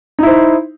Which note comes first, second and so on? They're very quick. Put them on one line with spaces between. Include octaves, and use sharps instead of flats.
D#4 E4 C5